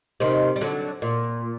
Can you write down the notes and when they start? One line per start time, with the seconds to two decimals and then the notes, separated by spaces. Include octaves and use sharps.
0.20 C3 D#3
0.56 G3
0.61 D3 F#3
1.02 A#2